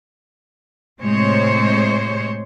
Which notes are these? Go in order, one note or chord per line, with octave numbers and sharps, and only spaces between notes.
A2 C3 G#3 C5 C#5